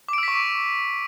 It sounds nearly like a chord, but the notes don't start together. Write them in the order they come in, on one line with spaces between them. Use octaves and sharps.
D6 D7 E6 B6 C#6